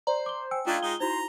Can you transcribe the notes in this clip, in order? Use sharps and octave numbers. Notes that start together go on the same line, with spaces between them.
C5 D5 A#5
D6 G7
G5 G#5 E6
A3 D4 D#4 F4 G5 G#6
G#3 D#4 G7
D#4 E4 F#4 C5 A#5